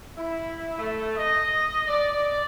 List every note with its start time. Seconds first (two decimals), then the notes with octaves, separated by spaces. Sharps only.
0.17 E4
0.79 A3
1.17 D#5
1.87 D5